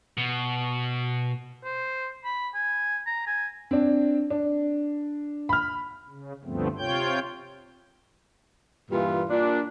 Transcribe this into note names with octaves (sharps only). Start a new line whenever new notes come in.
B2
C5
B5
G#5
A#5
G#5
C4 D4
D4
B5 F6
C#3
D2 G2 F3 A3 B3 C4
C3 F4 C#5 G5 G6
G2 A#2 E3 F4
A#2 D4